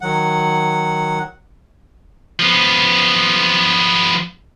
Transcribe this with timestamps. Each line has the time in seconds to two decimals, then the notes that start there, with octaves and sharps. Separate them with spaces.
0.01 D#3 F#3 F#5
2.39 F3 B3